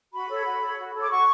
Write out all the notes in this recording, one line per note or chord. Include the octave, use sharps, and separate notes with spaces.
F#4 B5
A4 C#5
F#4
A4 C#5
F#4
A4 C#5
D6
F#4 C#6